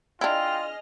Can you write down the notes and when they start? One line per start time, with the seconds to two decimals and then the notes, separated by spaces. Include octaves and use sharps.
0.21 D4 E4 F4 G#4 D#5 G5 F6